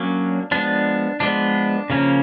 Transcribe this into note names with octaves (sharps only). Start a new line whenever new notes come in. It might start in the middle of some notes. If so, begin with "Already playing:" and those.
Already playing: F#3 A#3 C#4 D4
F3 G#3 B3 D4
F3 G#3 B3 D4
C#3 F3 A#3 C#4